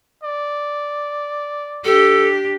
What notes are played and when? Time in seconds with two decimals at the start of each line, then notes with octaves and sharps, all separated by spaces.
0.23 D5
1.84 D4 G4 A4